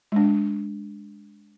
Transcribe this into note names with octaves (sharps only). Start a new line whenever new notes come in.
G#3 D4